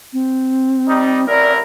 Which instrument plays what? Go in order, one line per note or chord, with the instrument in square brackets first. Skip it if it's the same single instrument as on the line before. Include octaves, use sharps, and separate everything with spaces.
[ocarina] C4
[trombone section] G3 D#4
[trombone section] A1 E4 A#4 [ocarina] D5